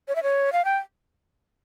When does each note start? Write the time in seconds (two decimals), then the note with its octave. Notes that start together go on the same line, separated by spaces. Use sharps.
0.08 C#5
0.16 E5
0.23 C#5
0.53 F5
0.65 G5